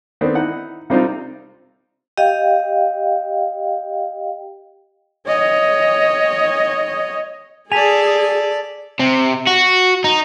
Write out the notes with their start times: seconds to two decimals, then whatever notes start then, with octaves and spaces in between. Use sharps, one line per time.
0.21 D#3 B3 C4 D4 A4
0.35 D#4 E4 F#5
0.90 C3 G3 C4 D4 D#4 F4
2.18 G4 D#5 F5 G5
5.28 C#5 D#5
7.72 G#4 A4 D5 G#5 A5 B6 F7
8.99 C3
9.47 F#4
10.04 D#4